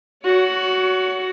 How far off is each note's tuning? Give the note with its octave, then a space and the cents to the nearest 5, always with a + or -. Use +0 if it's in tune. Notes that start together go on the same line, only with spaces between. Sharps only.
F#4 +5 C#5 +30